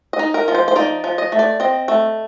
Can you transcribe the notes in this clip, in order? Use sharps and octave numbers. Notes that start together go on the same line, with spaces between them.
D#5
D#4
A#4
F3
C5
C5
D#4 D5
F3
D#5
A3
D5
C4 D#5
A3